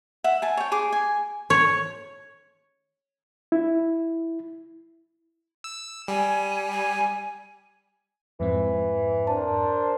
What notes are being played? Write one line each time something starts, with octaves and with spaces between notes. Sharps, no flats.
E5 F#5
G#5 A5
C#5 G5
G#4 D6
G#5
C#5
E4
E6
G3 G#5
G#5
F2 G#2 E3 C4
D4 A#4 C5 A5